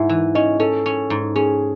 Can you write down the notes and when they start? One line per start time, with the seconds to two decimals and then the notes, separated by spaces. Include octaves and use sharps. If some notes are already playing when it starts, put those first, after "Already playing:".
Already playing: G#2 E4 E5 F#5
0.09 E3
0.35 C#4 D#4 D#5
0.60 C#4 A4
0.86 C#4
1.10 G#2
1.36 C#4 G#4